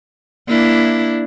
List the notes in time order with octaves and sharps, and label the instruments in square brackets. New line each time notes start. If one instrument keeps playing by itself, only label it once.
[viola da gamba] A#3 D4 E4